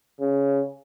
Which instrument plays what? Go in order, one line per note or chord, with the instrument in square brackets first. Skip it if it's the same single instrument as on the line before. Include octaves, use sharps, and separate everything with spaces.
[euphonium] C#3